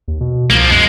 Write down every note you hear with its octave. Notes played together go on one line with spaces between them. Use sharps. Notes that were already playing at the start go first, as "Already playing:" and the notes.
D#2
B2
C2 F3 A#3
F#2 G#3